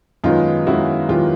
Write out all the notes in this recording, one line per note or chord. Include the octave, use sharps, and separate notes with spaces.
F#2 D#3 G#3 B3 D#4 F4
F#2 D#3 G#3 B3 E4 F#4
F#2 D#3 G#3 B3 F4 G4